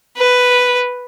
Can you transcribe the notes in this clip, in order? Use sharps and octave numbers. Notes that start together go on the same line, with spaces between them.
B4